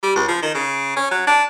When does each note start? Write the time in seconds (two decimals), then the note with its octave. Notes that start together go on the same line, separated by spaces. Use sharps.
0.03 G3
0.16 C#2
0.28 F3
0.43 D#3
0.54 C#3
0.96 C#4
1.11 F#3
1.27 D4